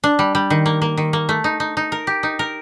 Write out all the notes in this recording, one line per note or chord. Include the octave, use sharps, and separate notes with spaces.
D4
G3
G3
D#3
A#3
A#3
D#3
A#3
A3
D#4
D#4
D#4
A#4
G4
D#4
A#4